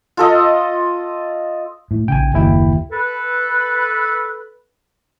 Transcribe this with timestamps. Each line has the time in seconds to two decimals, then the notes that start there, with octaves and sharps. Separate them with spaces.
0.17 F4 A4 D#5
1.91 A2
2.08 A#1 C#3 G5 G#5
2.34 F#1 D#2 E4 G5
2.91 A4 B4